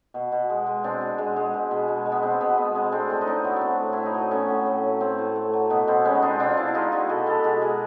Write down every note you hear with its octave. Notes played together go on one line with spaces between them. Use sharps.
B2
B2
G#3
G#3
B2 C4 D4
B2
G#3
G#3
B2
B2
G#3
G#3
B3
B2 C4
B2 B3
G#3 B3
G#3 C4
A3 C4 D4
A2 C4 D4
D#4
A2 D4 E4
F#3 B3
B3
A3 C4
A2
A2 E4
D#4
F#3 D4
A3 B3 C#4
A2
A2
F#3
A3 C4
A2
A2
F#3
B2 B3
B2 C4
G#3 B3 C#4
D#4
G#3 C4 D4
B2 C4 D4
F4
B2 D4 E4
E4
G#3 D#4 F4
G#3 E4 F#4
B2 A4 B4
B2 G4 A4
G#3 F#4 G#4
G#3 G#4 A#4